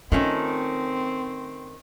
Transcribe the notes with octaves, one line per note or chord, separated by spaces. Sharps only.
D#3 A3 C4 C#4 F4